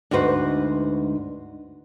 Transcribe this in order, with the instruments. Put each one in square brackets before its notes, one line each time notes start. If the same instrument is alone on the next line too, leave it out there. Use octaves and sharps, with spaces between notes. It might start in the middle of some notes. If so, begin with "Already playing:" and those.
[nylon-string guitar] D2 G#2 F#4 B4 C5